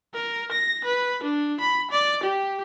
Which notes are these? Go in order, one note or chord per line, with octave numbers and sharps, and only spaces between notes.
A#4
A#6
B4
D4
B5
D5
G4